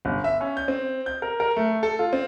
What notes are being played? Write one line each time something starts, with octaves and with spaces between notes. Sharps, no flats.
G1
E5
C#4
G6
C4
G6
A#4
A#4
A3
A4
F4
C4